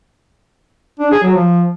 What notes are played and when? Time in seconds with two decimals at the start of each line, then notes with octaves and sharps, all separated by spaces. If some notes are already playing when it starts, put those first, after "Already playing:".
1.00 D4
1.11 G#4
1.23 F#3
1.34 F3